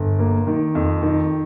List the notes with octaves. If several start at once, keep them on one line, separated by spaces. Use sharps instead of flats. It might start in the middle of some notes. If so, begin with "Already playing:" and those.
Already playing: G1
A#3
D#3
F2
D#3